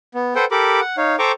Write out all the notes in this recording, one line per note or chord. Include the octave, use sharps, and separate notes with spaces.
B3
A4 B4 C5 F#5 G5
G4 A4 A#4 B5 D6
F#5
D#4 C#5 F5
A4 C5 G5 A#5 C#6 D6